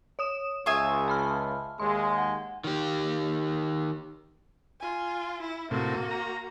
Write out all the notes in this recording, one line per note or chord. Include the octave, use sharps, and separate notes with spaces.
C#5 D#6 E7
C#2 F4 E5 G#5 C#6 D#6
A5 B5 F6
D#2 G#3 C6
F#5
D#3 G4
F4 G#5
E4
A2 C3 A#3 F#4
A#5